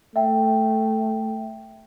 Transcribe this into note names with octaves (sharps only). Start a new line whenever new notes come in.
A3 E5 G5